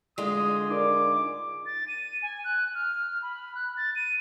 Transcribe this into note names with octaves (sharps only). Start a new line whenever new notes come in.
D3 G#3 F4 D#6
D#4 A#4 D5 D6
A6
D#7
G#5
F#6
F6
B5
F#6
A6
D#7